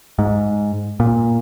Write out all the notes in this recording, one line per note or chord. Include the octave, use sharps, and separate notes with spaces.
G#2
A#2